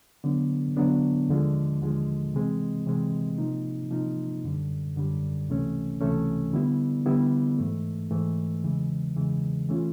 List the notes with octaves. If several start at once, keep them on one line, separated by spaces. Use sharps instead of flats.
D3 F#3 B3 D4
D3 F#3 B3 D4
D#2 D3 F3 G#3
D#2 D3 F3 G#3
C3 E3 G#3 C4
C3 E3 G#3 C4
C3 F3 A#3 D#4
C3 F3 A#3 D#4
F#2 D3 G3
F#2 D3 G3
C#2 C3 E3 A3 C#4
C#2 C3 E3 A3 C#4
D3 G3 B3 E4
D3 G3 B3 E4
G#2 E3 A3
G#2 E3 A3
E2 C#3 E3 G#3
E2 C#3 E3 G#3
E3 A3 C#4 F4